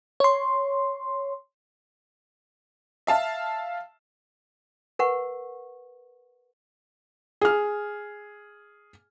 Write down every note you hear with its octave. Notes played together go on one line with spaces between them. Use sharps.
C#5 C6
E5 F5 A5
A#4 B4 F#5 C#6
G#4 F6